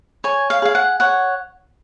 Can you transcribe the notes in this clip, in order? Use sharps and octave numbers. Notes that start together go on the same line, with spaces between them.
C#5 G#5
F5
G#4 F5
F#5
C#5 F#5